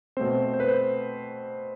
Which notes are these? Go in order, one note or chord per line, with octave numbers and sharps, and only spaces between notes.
B2 A3 C4 C5
C5
B4
C5